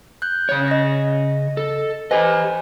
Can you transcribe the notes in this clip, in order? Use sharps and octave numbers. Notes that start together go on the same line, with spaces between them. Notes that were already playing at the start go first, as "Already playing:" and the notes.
F#6 G6
C#3 C#5
D#5 A#6
A4
G4 B4 C5 D#5 G#5